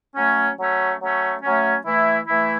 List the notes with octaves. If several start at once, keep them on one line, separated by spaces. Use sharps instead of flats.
F#3 A3 C#4
F#3 A3 C#4
F#3 A3 C#4
F#3 A3 C#4
E3 A3 E4
E3 A3 E4